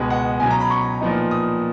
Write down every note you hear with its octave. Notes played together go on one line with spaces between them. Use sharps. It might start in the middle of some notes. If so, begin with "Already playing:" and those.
Already playing: C#2 B2 G#3 B3
F#5
B2 F#3 C#4 G#5
A#5
B5
C#6
A#2 F3 B3 D#4
D#6